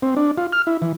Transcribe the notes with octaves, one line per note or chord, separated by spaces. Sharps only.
C4
D4
F4
F6
E4
E3